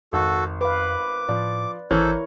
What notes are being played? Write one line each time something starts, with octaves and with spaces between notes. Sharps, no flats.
G#1 F2 F#4 A4
B4 F5 D6
A2 F3 D5
G#1 E3 E4 A4 A#4 C5 C#5 F6